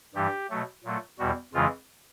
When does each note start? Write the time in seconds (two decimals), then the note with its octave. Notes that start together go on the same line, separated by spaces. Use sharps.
0.15 G2 E3 G3 G4
0.50 B2 F#3 A3
0.84 A#2 F#3 A3
1.19 E2 B2 G3 F#4
1.53 F2 C#3 E3 G#3 F4